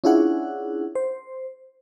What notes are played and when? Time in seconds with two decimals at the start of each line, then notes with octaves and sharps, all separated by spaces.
0.04 C#4 D4 E4 F4 G#4 F#5
0.95 C5